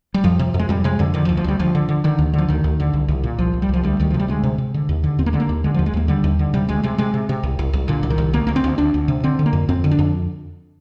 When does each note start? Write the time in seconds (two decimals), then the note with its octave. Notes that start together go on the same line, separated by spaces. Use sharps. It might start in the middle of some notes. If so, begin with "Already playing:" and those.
0.14 G3
0.24 F2 F3
0.39 C3
0.54 F2
0.59 G#3
0.69 F2 G3
0.84 C3 G#3
0.99 F2 D3
1.14 D3 D#3
1.25 F3
1.29 D2
1.37 F3
1.44 D2 G3
1.59 D2 F3
1.75 D3
1.89 D3
2.04 D3 D#3
2.19 D2
2.34 D3 F3
2.48 D2 D#3
2.64 D2
2.80 D3
2.93 C2
3.08 C2
3.24 A#2
3.39 C2 F3
3.54 C2
3.62 G3
3.69 C2 F3
3.83 D2 G3
4.00 D2 D#3
4.11 F3
4.14 C3
4.20 G3
4.28 D2 G#3
4.44 C3
4.58 C3
4.74 D3
4.89 D#2
5.04 D3
5.19 D#2 C4
5.26 A#3
5.33 D3 G#3
5.40 A#3
5.49 D#2
5.64 D3 G#3
5.74 D#2 F3
5.86 G#3
5.94 D#2 A#3
6.08 D3 G3
6.24 D#2
6.39 D3
6.54 C3 G3
6.69 D2 G#3
6.83 C3 G#3
6.98 C3 G#3
7.14 C3
7.29 C3
7.43 C2
7.59 C2
7.73 C2
7.88 A#2 D3
8.03 C2
8.10 D#3
8.18 C2
8.33 D2 A#3
8.47 D2 A#3
8.56 C4
8.64 D2
8.78 D2 D4
8.94 D2
9.08 C3
9.24 D3 C4
9.39 D3
9.46 A#3
9.53 F2
9.69 F2 C4
9.84 D3
9.91 D4
9.99 F2